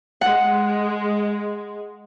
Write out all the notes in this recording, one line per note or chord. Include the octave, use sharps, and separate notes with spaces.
G#3 F#5